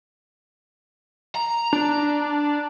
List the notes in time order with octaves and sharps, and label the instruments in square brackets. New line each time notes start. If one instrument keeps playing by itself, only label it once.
[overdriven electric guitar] A#5
[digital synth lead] D4